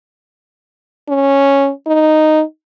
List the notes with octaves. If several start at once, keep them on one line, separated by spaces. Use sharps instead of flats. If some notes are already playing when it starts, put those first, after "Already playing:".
C#4
D#4